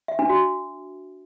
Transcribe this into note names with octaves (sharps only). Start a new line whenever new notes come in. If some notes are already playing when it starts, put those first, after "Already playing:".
E5
D4
F#4